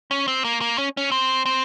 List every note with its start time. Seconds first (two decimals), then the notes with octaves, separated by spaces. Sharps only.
0.11 C#4
0.28 C4
0.44 A#3
0.61 A#3
0.78 C#4
0.97 C#4
1.12 C4
1.46 C4